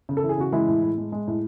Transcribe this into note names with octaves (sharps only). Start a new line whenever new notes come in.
C#3
A4
E3
G#4
C#3 F#4
E3 G#3 E4
A2
A2
G#3
G#3
A2